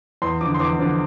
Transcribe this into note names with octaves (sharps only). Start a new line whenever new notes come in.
E2 C6
D3 F3 D6
C6
E2 D6
D3 F3